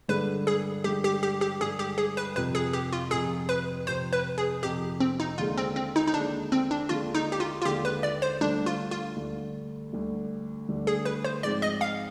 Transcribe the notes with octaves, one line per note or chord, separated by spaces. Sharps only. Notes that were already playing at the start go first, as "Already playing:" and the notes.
G2 D3 G#3 B4
G#4
G2 D3 G#3 G4
G4
G4
G4
G2 D3 G#3 G#4
G4
G#4
B4
F2 C3 F3 B4
G#4
G4
F4
F2 C3 F3 G#4
B4
F2 C3 F3 C5
B4
G#4
F2 C3 F3 G4
C4
D#4
D#2 D3 G#3 F4
C4
C4
D#4
D#4
D#2 D3 G#3 D4
C4
D4
D#2 D3 G#3 F4
D#4
G4
F4
F4
D#2 D3 G#3 G4
B4
D5
C5
D2 D3 G3 D4
F4
F4
D2 D3 G3
D2 D3 G3
D2 D3 G3
G#4
B4
C5
G#2 F3 G#3 C4 D#4 D5
D#5
F5